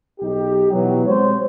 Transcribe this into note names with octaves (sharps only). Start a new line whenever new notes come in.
B1 D#4 G4
B2 E3 F#3
G#3 C4 C5 C#5